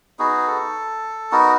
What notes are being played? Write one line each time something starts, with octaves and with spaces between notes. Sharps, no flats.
B3 D#4 F#4 G#4
A4
B3 D#4 F#4 A#4